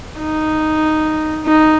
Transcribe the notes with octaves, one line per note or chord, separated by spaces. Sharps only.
D#4
D#4